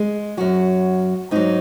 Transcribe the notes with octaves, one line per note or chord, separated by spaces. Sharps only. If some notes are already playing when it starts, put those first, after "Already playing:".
Already playing: G#3
F#2 F#3 F#4
G#2 F#3 D#4